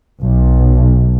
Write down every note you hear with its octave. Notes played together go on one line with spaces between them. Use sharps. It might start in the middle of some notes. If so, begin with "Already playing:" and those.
B1